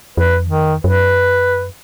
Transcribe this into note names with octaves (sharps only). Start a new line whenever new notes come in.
F2 B4
D#3
F#2 B4